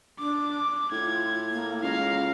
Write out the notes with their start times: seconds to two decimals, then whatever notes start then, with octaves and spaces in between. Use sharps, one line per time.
0.19 D4 D6
0.91 A2 F4 G#6
1.50 A#3
1.83 C#2 C#4 F5 A#5